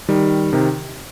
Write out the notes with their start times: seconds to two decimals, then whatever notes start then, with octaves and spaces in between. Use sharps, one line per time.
0.08 D#3 G3
0.53 C3 D#3